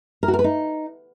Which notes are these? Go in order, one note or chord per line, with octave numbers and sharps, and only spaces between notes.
A#4
F#4
A#4
B4
D#4